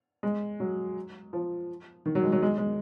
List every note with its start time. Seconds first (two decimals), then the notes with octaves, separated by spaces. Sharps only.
0.23 G#3
0.60 F#3
1.33 F3
2.06 D#3
2.15 F#3
2.23 G#3
2.32 F#3
2.42 G#3
2.58 G#3